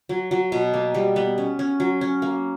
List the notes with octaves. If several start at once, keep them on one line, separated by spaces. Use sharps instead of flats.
F#3
F#3
B2
A#3
G3
B3
C#4
C#4
F#3
C#4
A#3